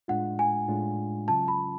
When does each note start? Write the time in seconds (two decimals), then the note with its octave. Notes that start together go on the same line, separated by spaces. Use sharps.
0.08 A2 G#3 D4 F4 F#5
0.39 G#5
0.68 A2 G#3 D4 F4
1.28 C#3 F#3 C#4 F4 A5
1.48 B5